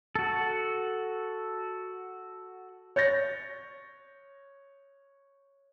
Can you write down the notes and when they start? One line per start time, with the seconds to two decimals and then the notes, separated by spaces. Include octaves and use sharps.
0.15 F#4 A4
2.96 C#5 G6 A6 A#6